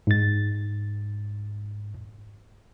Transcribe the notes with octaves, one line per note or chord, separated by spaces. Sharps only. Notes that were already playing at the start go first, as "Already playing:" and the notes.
G#2 A6